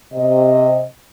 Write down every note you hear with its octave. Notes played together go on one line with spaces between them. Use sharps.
C3 D#5